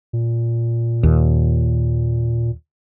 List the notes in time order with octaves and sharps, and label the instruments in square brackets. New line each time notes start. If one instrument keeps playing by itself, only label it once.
[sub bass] A#2
[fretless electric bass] D#2